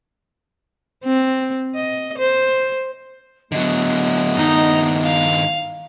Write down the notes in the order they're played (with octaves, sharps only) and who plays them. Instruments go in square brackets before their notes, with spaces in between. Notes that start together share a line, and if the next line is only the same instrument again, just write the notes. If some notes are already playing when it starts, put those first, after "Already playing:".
[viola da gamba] C4
D#5
C5
[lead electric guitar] D3 F#3 [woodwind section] A3 B3 [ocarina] D#5
[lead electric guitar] G2 D#3 [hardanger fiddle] D#4
[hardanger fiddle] F5